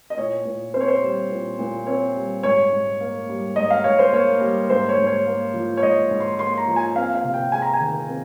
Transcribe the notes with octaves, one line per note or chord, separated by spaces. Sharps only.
D#5
A#2 C#5
A#2
C4 C5
C#5
C5
G3
A#2
A#2
C4 C#5
G3
G#2 C#5
G#2
A#3
G3
G#2 D#5
F5
G#2 C#5
C5
A#3 C#5
G3
G#2 C5
C#5
G#2
C#5
A#3
F3
C#5
G#2 D#5
G#2
C6
A#3 C6
A#5
F3
G#5
C4 F5
F5
C3
G5
G#3 G#5
A#5
G#5
D#3
C4